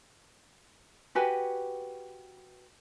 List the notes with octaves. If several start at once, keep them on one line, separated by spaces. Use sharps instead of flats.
F#4 G4 B4 G#5